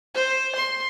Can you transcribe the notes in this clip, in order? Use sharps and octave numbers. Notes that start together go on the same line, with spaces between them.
C5
C6